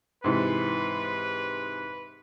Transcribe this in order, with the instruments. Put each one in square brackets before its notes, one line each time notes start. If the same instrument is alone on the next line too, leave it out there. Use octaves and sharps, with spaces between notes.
[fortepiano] G#2 C3 E3 [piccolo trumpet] B4